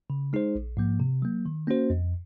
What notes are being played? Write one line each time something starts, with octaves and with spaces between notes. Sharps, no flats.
C#3
G#3 D#4 G#4 C5
A#1
G#2 F3 A#3
C3
F#3 A#3
D#3
A#3 C#4 F#4 C5
F2